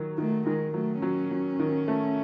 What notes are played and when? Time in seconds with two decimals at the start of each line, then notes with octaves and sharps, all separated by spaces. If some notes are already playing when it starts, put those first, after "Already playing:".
Already playing: D#3 F#3
0.18 D#3 A3
0.46 D#3 G#3
0.74 F#3 A3
1.02 F#3 C#4
1.31 F#3
1.60 D#3
1.88 A3